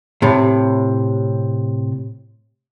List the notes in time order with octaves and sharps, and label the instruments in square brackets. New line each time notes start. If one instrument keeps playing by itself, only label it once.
[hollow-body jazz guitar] A2 C3